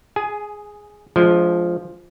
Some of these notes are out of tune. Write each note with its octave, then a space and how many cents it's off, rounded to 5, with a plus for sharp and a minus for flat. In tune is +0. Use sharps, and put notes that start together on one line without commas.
G#4 +0 G#5 +25
F3 +0 G#3 +30 D4 -5